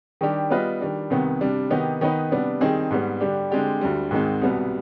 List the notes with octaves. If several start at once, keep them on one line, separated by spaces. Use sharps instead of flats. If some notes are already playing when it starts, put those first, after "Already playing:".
D#3 G3 D4 G4
G3 B3 F4 B4 D#5
D#3 G3 D4
C2 C3 D#3 B3
C3 G3 D4
C3 D#3 B3 D#4 G4
D#3 B3 D#4 B4
C3 G3 B3 D4
D#3 G3 C4 D#4 G#4
G#2 G3 B3
D3 G3 D4 G4
D3 G#3 C4 G4 D5
D2 D3 G3
G#2 D#3 G#3 C4
C2 B2 G3 B3